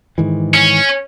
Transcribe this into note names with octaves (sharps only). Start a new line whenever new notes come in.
G#2 D#3 E3
C#4